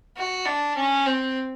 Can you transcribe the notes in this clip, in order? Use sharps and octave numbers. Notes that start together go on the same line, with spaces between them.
F#4
D4
C#4
C4